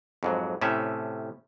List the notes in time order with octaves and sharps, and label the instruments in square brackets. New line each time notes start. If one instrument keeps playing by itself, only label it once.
[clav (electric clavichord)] F2 G#2 F#3
A2 C3 A3 C#4 E5